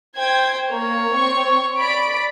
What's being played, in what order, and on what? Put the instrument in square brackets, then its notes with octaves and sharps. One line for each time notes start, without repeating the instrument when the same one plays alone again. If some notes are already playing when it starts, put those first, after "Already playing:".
[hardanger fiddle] C5 G5 [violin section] G#6
[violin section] A#3 [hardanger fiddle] C#5
[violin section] C4 C#6
D5 B5 D7